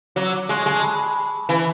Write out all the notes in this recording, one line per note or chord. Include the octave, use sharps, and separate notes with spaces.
F#3 D6
E6
D6
G#3 C#6
G#3
A5
B5
E3